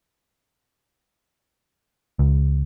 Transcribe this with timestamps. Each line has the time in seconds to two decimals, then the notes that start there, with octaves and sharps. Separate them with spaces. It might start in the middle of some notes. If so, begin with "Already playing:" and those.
2.19 C#2